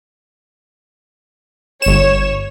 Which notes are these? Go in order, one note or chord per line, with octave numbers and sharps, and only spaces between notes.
G1 C#5 E7